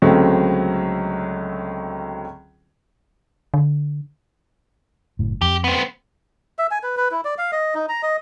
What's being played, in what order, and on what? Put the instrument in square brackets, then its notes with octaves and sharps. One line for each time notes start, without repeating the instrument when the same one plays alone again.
[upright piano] C#2 D3 F#3 A3 C4 C#4
[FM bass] D3
[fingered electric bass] F#1 A2
[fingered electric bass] F2 [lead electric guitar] G4
[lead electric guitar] B3 C4
[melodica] E5
G#5
B4
B4
E4
D5
F5
D#5
D#4
A#5
D#5